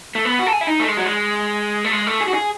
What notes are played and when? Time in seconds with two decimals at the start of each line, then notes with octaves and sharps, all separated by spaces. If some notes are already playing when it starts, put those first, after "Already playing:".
0.15 A3
0.25 B3
0.39 F#4
0.47 A4
0.53 G#4
0.61 E4
0.67 D#4
0.80 A3
0.88 G#3
0.97 F#3
1.05 G#3
1.84 A3
1.92 G#3
2.07 A3
2.21 G#4
2.28 F#4
2.34 G#4